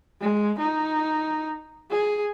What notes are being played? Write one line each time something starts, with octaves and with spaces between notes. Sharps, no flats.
G#3
D#4
G#4